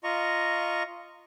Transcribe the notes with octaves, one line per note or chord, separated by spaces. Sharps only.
F4 D#5 A#5 C#6